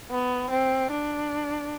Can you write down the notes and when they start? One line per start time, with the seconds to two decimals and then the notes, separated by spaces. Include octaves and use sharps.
0.11 B3
0.51 C4
0.91 D4